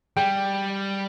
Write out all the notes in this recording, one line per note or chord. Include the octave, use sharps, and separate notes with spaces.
G3 G5